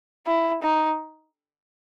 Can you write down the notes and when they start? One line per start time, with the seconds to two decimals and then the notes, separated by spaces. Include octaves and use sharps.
0.27 E4
0.62 D#4